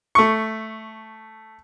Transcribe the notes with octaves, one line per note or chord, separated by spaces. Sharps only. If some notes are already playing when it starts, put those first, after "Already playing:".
A3 C#6